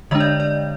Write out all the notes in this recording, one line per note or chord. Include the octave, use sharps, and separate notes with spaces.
D3 G#3 D4 D#5
D5
D5